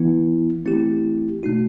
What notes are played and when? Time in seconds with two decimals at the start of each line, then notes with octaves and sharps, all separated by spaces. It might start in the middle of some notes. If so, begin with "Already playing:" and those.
Already playing: E3 B3 E4
0.65 E3 A3 C4 E4 G4
1.43 B2 A3 D#4 F#4